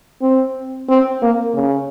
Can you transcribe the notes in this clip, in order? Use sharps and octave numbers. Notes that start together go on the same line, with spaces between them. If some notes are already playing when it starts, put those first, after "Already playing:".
C4
C4
A#3
C#3